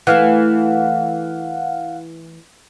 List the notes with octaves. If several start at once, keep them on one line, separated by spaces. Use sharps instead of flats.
E3 A3 F5 F#5